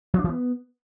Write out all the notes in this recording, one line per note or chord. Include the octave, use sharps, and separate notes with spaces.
F3
D4
E3
B3